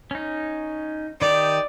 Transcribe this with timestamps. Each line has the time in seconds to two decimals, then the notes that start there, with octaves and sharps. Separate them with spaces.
0.11 C#4 D#4
1.22 D#3 D#4 G4 D5